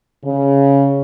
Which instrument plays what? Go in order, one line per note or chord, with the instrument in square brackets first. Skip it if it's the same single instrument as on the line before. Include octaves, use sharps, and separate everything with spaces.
[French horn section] C#3